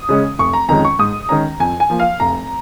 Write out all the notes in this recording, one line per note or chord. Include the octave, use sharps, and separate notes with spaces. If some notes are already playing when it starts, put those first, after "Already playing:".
Already playing: D#6
C#3 G#3 C#4
F1 C#6
A#5
F2 D#3 G#3 C#4 A#5
C#6
G#2 D#6
D#3 G#3 C#4 A#5
F2 G#5
G#5
F3 A#3
F5
F1 A#5